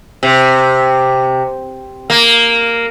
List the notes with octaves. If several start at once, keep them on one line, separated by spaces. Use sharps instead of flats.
C3
A#3